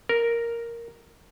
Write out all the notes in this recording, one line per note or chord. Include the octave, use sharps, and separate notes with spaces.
A#4